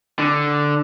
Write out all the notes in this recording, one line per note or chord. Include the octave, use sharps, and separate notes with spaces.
D3